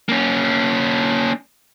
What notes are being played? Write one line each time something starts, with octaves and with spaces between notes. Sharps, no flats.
A#3 C#4